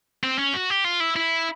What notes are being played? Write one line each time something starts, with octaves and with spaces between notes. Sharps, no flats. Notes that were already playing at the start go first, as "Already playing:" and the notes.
C4
C#4
F#4
G4
F4
E4
E4